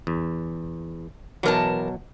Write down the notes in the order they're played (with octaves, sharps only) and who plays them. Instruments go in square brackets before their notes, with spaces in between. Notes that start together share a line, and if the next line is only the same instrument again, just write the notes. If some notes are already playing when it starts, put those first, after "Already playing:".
[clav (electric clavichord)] E2
[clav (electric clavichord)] B2 F#3 [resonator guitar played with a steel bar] E3 A#4 A5